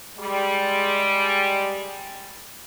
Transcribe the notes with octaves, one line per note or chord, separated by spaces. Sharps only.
G3 G#3